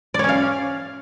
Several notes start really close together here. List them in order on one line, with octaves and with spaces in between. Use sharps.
D5 C#5 C#4 F5